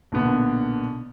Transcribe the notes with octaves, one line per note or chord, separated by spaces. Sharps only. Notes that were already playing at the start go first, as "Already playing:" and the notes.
B1 A#2 D3 B3